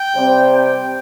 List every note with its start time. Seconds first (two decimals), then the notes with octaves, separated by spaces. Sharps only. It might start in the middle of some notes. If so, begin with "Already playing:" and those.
Already playing: G5
0.15 C3 G3 C4
0.53 G5